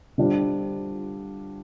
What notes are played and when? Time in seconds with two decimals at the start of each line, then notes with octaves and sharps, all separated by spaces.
0.18 D3 G3 D4 F4 C5